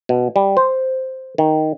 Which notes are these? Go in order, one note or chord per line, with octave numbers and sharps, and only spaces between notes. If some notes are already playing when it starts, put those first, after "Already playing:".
B2
G3
C5
D#3